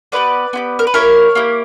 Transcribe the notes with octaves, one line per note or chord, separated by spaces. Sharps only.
B3 E4 G4 B4 D5
B3 E4 G4
A#4
B4
A#3 E4 G4 A#4 C#5
A#3 E4 G4